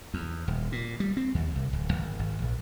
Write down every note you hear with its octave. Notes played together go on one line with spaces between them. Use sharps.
E2
D#1
A#2
G3
C4
D#2
C2
D1
G#1
G#1
A#1